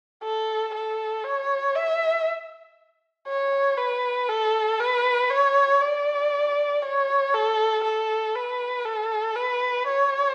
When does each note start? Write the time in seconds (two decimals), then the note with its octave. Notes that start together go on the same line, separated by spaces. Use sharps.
0.23 A4
0.74 A4
1.24 C#5
1.75 E5
3.27 C#5
3.77 B4
4.29 A4
4.80 B4
5.30 C#5
5.81 D5
6.83 C#5
7.34 A4
7.84 A4
8.35 B4
8.85 A4
9.36 B4
9.87 C#5